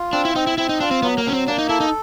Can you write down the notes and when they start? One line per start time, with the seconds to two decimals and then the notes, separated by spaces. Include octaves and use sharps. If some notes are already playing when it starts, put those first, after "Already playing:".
Already playing: F4
0.13 C4 D4
0.25 E4
0.35 C4 D#4
0.47 E4
0.58 C4 E4
0.69 D#4
0.80 D4 F4
0.91 C4
1.03 F#3 B3
1.18 A#3
1.25 F#3 C#4
1.33 C4
1.48 A#3 D4
1.58 D#4
1.69 E4 A4
1.80 D#4